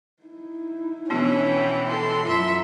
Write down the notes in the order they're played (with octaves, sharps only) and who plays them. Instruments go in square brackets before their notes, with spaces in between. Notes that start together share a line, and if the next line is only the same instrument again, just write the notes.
[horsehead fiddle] D#4 E4
[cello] B2 E3 [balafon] B3 D4 F#4 [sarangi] C#4
[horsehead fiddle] G5
[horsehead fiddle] A4 [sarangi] C6
[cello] F#2 E5 [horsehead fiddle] F4 A#5